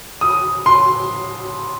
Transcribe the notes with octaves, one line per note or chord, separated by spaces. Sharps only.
D#6
C6